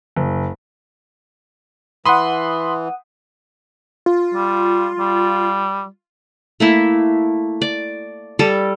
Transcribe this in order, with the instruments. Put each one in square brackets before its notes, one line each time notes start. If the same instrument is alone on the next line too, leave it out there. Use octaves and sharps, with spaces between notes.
[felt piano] F#1
[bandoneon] E3 [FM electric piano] F#5 D#6 [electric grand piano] B5 C6
[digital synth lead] F4
[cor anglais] G3
G3
[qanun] A3 A#3 E4
D5
G3 A4